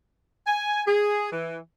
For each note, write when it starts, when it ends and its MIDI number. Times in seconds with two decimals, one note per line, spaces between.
0.47 0.81 80
0.87 1.30 68
1.32 1.58 52